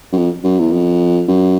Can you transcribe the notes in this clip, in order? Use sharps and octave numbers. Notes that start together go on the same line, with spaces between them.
F#2
F2
F#2
E2
F2
F#2